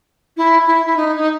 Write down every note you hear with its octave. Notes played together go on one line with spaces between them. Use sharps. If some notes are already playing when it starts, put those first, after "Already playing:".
E4
E4
E4
D#4
D#4